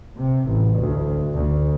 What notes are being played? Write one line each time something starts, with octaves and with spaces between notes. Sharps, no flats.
C3
A1
D2
D2